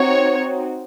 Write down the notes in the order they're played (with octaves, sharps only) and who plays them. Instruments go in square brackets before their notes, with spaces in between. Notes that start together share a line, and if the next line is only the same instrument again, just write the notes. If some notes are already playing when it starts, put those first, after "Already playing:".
Already playing: [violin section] C4 D#4 F#4 C#5